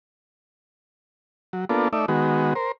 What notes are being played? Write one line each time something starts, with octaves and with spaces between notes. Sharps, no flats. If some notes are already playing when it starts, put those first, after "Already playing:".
F#3
A#3 B3 D4 F4 A4
A3 D#4 D5 E5
D#3 G#3 B3 F#4
A#4 C5